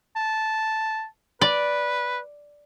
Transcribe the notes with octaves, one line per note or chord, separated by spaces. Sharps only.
A5
B4 D5